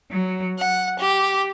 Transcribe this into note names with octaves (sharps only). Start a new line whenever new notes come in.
F#3
F#5
G4